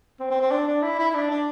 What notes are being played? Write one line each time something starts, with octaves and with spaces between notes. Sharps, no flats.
C4
C4
C4
D4
D4
E4
E4
E4
D4
D4